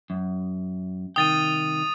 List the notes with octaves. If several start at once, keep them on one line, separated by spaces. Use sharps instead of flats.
F#2
C2 D#3 G5 D#6 A6 D#7